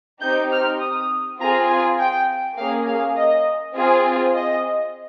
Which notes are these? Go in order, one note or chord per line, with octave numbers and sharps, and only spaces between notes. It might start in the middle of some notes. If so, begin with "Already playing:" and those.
C4 D#4 G4 G6
F6
D#6
C4 F4 G#4 A#5
G#5
G5
A#3 C#4 G#4 F5
F5
D#5
C4 F4 G#4
D#5